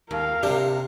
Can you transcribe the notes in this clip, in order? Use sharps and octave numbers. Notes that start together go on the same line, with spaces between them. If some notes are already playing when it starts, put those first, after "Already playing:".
D#2 A#4 F5
C3 D4 G4